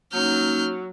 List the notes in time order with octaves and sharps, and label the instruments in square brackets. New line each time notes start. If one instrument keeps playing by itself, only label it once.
[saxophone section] F#3 [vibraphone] A#3 C#4 D#4 [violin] F6 G6